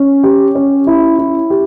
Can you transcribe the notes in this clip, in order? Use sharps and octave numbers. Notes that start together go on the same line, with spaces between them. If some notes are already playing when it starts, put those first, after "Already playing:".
Already playing: C#4
G4
C#4
E4
E4
G4